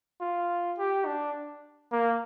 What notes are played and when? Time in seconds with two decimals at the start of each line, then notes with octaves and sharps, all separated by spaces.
0.21 F4
0.78 G4
1.06 D4
1.92 A#3